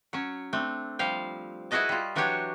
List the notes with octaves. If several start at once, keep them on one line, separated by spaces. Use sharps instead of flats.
F#3 C#4
A3 C4 D4
F3 G3 F5 G5
E4 F#4 G#4 B4 D#5 A5
G3 F4
E3 F#3 D4 F#4 G4 C#5